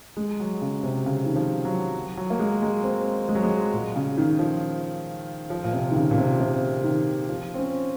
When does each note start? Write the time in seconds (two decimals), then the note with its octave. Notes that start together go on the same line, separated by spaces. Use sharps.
0.17 G#3
0.40 F#3
0.62 C#3
0.83 C3
1.06 C#3
1.26 D#3
1.36 F3
1.65 F#3
2.17 F#3
2.30 A#3
2.39 G#3
2.62 G#3
2.84 C4
3.29 G#3
3.35 F#3
3.43 G#3
3.73 A#2
3.96 C#3
4.17 D#3
4.39 F3
5.50 F3
5.64 A#2
5.73 C3
5.91 D#3
5.95 C#3
6.11 A#2
6.18 C3
6.40 C3
6.84 D#3
7.28 F3
7.54 C4
7.58 C#4